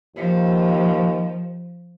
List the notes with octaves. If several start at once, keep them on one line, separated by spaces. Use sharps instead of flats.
D#2 F3